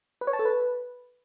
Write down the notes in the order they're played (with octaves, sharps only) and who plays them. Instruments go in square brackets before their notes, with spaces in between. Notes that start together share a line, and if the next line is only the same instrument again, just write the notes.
[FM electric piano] B4
C#5
A5
A4
B4